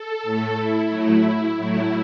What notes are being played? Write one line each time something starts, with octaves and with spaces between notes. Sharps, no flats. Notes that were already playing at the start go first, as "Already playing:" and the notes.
Already playing: A4
A2 A3
E4
A2 F#3 A3
A2 F#3 A3 E4